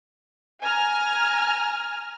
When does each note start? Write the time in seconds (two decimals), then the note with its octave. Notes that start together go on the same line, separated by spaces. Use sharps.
0.61 G#5 A#5 F6